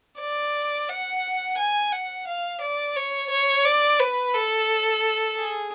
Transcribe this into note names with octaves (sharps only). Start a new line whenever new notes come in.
D5
F#5
G#5
F#5
F5
D5
C#5
C#5
D5
B4
A4
G#4